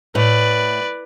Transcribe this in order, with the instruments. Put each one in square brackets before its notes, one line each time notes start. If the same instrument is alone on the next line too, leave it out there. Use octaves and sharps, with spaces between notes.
[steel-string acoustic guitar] A2 [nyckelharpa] B4 D5